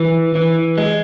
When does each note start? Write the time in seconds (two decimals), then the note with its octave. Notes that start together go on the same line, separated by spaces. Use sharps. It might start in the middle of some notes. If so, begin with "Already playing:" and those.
Already playing: E3
0.35 E3
0.78 G#3